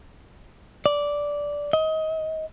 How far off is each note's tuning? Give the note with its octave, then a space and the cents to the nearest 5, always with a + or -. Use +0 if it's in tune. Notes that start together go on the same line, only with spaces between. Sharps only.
D5 -10
D#5 +25